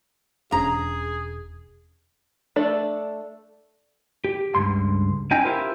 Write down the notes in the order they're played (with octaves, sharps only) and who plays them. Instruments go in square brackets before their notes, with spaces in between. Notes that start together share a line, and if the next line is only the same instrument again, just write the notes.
[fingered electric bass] E1 C#4 D4 [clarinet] G#4 [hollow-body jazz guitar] A#5
[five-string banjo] A3 D4 A4 D5
[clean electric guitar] G4
C#2 G2 C6
C#4 D#4 G5 G#5
E4 F4 G4 A#4 C5